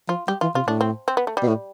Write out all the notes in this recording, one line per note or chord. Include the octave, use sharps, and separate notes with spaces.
F3 F4
G3 G4
E3 F4
C3 F4
A2 D4
C4
C4
B3
A3
G3
B2
A2